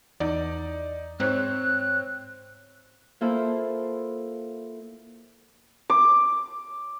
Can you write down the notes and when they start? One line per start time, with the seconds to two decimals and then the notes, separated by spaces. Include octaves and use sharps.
0.20 E2 D#4 D5
1.20 G#2 C4 C5 C#5 F#6
3.21 A#3 E4 F4 A4 C5
5.90 D6